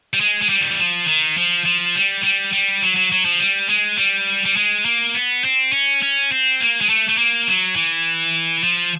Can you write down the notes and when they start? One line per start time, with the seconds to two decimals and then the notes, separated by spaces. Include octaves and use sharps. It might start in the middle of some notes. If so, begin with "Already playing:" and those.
0.14 G3
0.21 G#3
0.42 G#3
0.49 G3
0.61 D#3
0.69 E3
0.79 F3
1.07 D#3
1.37 F3
1.66 F3
1.95 G3
2.24 G3
2.53 G3
2.82 F#3
2.97 F#3
3.12 F#3
3.25 F3
3.40 G3
3.69 G#3
3.98 G3
4.46 G3
4.56 G#3
4.85 A#3
5.14 B3
5.44 C4
5.72 C#4
6.02 C#4
6.32 C4
6.60 A#3
6.81 G#3
6.90 A3
7.09 A3
7.18 A#3
7.48 F#3
7.76 E3
8.64 F3